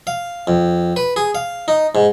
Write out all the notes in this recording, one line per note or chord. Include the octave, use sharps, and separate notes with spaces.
F5
F2
B4
G#4
F5
D#4
G#2